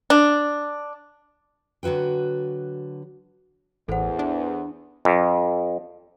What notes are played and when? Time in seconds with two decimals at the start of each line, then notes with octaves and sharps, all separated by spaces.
0.10 D4
1.83 D3 F#3 F#4 B4 G5
3.88 A1 E2 A4 C5 F#5
4.19 D4
5.05 F2